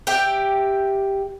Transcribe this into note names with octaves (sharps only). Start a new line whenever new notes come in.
G4 E5 G5